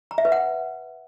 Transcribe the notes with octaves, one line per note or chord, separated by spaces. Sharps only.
A#5
E5
B4
F#5